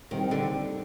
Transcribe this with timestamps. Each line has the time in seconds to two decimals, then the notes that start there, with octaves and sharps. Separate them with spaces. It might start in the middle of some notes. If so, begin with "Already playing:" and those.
0.11 D#3 G3 C4 D#4
0.31 D3